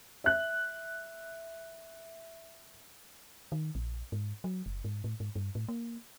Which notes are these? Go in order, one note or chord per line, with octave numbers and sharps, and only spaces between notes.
E5 F#6
D#3
A#1
G#2
F#3
F#1
G#2
A2
G#2
G2
A2
A#3